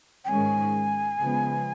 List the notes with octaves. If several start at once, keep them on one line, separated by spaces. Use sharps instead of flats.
G5
G#2 D#3 G#3 C#4 G#5
C#3 F3 G#3 B3